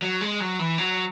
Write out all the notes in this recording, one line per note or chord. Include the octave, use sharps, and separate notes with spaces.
F#3
G#3
F#3
E3
F#3